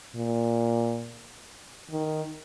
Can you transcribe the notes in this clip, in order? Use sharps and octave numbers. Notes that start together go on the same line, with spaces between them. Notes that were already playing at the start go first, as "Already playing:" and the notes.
A#2
D#3